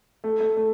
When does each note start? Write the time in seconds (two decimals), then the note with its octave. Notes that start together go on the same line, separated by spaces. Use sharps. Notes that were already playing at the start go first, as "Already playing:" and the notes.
0.24 A3
0.40 A3
0.57 A3